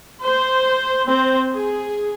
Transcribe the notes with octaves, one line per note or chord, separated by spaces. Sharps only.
C5
C4 C5
G#4